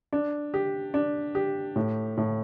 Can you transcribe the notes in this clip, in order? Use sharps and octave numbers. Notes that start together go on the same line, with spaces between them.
D4
G4
D4
G4
A2
A2